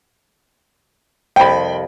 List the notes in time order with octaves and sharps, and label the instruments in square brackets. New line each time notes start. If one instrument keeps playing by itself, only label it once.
[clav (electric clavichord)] C2 F2 [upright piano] G5 B5